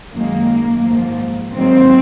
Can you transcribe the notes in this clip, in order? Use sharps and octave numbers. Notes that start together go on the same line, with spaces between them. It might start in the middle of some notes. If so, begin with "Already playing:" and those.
F#2 D#3 G#3 A#3
G#2 F3 A#3
G#2 D#3 F#3 A#3 C4